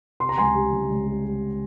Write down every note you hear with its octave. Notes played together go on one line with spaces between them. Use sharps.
C3 C6
A#5
C#2 G#5 C6
G3
C#2
C#2
G3
G3